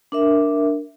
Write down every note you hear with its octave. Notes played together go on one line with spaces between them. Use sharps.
D4 A#4 E5